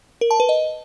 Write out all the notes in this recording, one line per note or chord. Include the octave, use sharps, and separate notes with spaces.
A#4
A5
B4
D#5